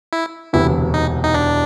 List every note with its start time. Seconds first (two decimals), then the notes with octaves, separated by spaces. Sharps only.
0.13 E4
0.53 E1 D2 C3 E3 E4
0.94 D#4
1.24 D#4
1.34 D4